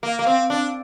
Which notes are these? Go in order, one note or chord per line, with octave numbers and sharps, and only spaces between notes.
A#3
A#3
C4
D4